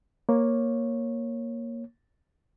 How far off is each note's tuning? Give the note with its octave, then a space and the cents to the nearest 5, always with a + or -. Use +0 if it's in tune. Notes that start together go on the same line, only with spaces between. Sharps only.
A#3 +5 C#5 -15